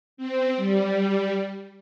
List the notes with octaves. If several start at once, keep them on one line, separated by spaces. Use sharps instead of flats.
C4
G3